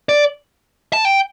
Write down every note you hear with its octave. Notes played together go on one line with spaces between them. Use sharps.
D5
A5
G5